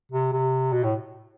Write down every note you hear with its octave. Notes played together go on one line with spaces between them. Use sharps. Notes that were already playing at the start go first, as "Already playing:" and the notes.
C3
C3
B2
A2